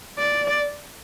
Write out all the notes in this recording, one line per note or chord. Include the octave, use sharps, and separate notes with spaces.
D5